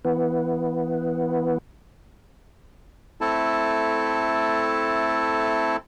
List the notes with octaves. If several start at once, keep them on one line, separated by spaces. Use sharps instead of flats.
E3 B3
A3 C4 E4 A4 A5